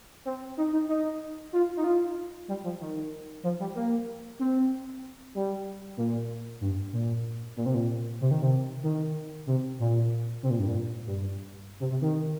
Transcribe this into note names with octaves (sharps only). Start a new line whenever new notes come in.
C4
D#4
D#4
D#4
F4
D#4
F4
G3
F3
D#3
F3
G3
A#3
C4
G3
A#2
G2
A#2
A#2
C3
A#2
C3
D#3
C3
D#3
C3
A#2
C3
A#2
G2
A#2
G2
C3
C3
D#3